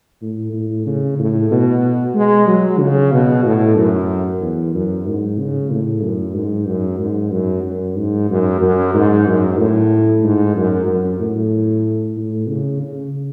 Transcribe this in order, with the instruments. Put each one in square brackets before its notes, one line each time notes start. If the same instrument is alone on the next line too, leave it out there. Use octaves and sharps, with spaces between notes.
[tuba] A2
A2
C#3
A2
B2
G#3
F#3
C#3
B2
A2
F#2
E2
F#2
G#2
C#3
A2
F#2
G#2
F#2
G#2
F#2
F#2
G#2
F#2
F#2
G#2
F#2
A2
G#2
F#2
F#2
A2
A2
C#3
C#3